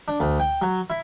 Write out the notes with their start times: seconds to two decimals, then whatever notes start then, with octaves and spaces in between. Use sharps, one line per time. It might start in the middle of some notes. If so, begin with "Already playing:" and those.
0.08 D4
0.20 D2
0.40 G5
0.62 F#3
0.90 E4